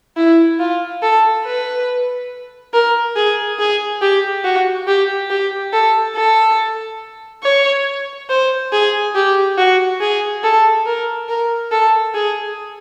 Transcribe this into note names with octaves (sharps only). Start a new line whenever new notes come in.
E4
F4
A4
B4
A#4
G#4
G#4
G4
F#4
G4
G4
A4
A4
C#5
C5
G#4
G4
F#4
G#4
A4
A#4
A#4
A4
G#4